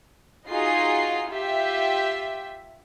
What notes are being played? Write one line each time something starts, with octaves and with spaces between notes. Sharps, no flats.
D#4 F4 F#4 G#4 D#5 C7
F4 G4 E5